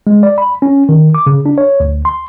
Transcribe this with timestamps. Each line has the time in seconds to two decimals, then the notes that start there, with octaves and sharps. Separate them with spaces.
0.07 G#3
0.23 D5
0.38 B5
0.62 C#4
0.89 D#3
1.15 D6
1.26 C#3
1.46 D4
1.58 C#5
1.80 D2
2.05 C6